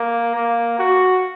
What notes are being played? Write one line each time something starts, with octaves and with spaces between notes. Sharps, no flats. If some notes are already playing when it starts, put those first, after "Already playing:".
Already playing: A#3
A#3
F#4